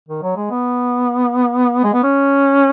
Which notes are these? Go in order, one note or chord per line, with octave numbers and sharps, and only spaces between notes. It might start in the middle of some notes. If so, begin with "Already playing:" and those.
D#3
F#3
G#3
B3
G#3
B3
C#4